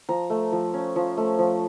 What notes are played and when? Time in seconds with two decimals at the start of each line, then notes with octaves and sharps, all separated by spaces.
0.09 F3 A#5
0.30 A3
0.52 F3
0.74 C#4
0.96 F3
1.17 A3
1.39 F3